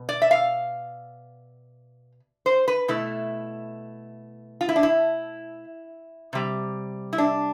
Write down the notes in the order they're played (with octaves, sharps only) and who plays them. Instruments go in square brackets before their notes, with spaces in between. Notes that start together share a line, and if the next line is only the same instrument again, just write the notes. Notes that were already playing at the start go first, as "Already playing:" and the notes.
Already playing: [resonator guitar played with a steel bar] B2
D5
E5
F5
C5
B4
B2 A3 E4
F4
E4
D4
E4
C3 G3
E4
D4